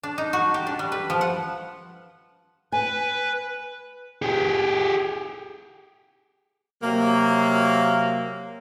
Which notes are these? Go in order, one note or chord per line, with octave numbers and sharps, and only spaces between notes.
D4
D#4
F#4
G4
D4
G3
B4
F3
F#5
B4 G#5
G4 G#4
C3 F#3 A#3